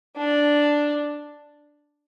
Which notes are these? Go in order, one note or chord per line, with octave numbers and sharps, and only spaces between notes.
D4